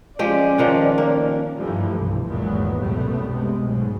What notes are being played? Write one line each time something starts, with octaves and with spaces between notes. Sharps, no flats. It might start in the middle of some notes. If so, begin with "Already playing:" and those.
F3 G#3 C#4 G4 D5
D#3 F3 D4
A#3
G2 D3 E3 F3 G3 A3
C2 B2
G#1 E2 A#2 F#3 G#3 B3
C2 F#2 B2 G3 A3 B3
C3 G#3
B1 G#2 B2